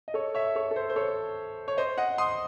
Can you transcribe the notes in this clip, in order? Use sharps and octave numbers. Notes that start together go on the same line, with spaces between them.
D#5
A4 C#5
C#5 E5
A4 C#5
A4
C5
C5
A4 C#5
C#5
C5 D#5
D#5 F#5
C6 D#6